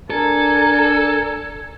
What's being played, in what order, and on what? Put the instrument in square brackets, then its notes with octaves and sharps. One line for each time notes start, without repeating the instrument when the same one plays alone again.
[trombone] D4 [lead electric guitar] A4 [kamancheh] A#4 [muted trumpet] G#5